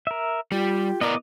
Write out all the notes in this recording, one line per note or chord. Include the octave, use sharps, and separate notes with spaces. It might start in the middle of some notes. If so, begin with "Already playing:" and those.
A#4 E5
G3 F4 G4
B3 E4 A#4 D5 D#5 D6